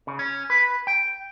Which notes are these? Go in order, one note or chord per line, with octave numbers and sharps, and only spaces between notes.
C#3
C#4
B4
G5